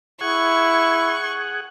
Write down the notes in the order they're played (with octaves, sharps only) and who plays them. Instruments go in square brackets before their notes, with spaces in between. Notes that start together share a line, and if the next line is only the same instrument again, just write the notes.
[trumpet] E4 [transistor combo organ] G#4 F#5 [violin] C#6